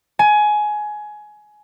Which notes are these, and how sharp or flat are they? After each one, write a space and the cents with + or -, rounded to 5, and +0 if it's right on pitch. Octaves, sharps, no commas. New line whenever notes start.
G#5 +20